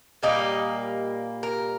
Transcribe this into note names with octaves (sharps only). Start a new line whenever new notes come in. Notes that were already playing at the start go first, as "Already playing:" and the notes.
A#2 G3 A#3 D#4
A#4